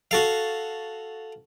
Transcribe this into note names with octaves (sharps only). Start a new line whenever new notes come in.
F#4 A4 F5